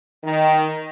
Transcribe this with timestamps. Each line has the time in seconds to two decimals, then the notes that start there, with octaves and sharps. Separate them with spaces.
0.24 D#3